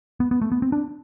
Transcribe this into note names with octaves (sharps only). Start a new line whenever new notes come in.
B3
B3
A3
B3
C4
D4